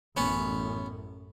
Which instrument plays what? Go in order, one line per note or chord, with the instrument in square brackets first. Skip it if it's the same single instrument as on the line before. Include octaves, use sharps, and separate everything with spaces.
[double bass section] A1 F#2 [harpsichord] B3 C#4